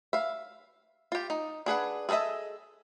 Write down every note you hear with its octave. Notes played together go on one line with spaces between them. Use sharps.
E5 F5
F4 G4
D#4
D4 G#4 B4 F#5
G#4 A4 B4 D#5 E5